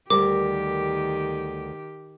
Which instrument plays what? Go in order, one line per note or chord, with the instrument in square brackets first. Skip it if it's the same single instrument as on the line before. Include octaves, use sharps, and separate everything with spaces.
[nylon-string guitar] D2 G3 A#4 [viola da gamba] D#3 G4 [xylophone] D6